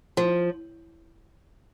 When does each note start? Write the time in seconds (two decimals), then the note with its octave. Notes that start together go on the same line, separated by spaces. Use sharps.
0.17 F3